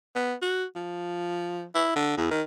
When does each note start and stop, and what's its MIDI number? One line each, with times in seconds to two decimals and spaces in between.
0.15 0.34 59
0.42 0.65 66
0.76 1.66 53
1.75 1.93 64
1.96 2.16 50
2.18 2.29 40
2.31 2.42 51